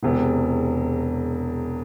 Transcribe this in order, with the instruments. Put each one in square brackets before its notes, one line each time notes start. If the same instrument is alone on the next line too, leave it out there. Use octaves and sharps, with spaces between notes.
[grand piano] E1 E2 C3